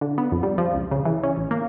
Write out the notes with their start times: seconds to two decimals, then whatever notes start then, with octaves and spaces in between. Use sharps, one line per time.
0.01 D3
0.18 B3
0.32 F2
0.43 G3
0.58 F3
0.74 C#2
0.91 C#3
1.05 E3
1.23 C#4
1.37 A1
1.51 A#3